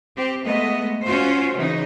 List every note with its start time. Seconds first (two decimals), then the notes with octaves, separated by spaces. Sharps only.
0.17 C4 G4
0.45 G#3 A3 B3 D#5
1.04 C#4 F4 F#4 C5
1.53 C#3 E3 D#4